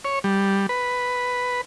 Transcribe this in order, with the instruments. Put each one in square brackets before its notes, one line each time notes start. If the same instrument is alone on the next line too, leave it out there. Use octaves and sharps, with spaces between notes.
[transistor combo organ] C#5
G3
B4